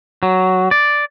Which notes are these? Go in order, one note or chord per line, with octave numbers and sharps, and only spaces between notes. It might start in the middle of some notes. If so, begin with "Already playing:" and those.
F#3
D5